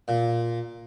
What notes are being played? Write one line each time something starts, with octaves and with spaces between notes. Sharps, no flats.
A#2